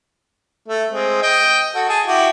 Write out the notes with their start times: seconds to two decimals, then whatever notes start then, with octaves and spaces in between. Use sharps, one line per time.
0.68 A3
0.91 G#3 C4
1.22 D#5 G5
1.75 F#4 A4
1.89 G#4 A5
2.06 E4 F#4 G4